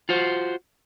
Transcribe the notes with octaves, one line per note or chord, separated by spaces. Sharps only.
F4 F#4 C5